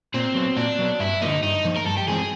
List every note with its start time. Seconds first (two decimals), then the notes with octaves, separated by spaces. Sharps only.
0.14 A#2 C4
0.35 F#3 B3
0.57 A#2 D4
0.79 F#3 B3
1.00 G2 E4
1.21 D3 F3 A#3 D#4
1.43 G2 D#4
1.65 D3 F3 A#3
1.77 A#4
1.86 G2 A4
1.97 G4
2.07 E3 G#3 C4 G#4